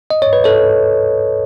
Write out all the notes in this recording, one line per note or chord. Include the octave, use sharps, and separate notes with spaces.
D#5
C#5
B4
A4 C#5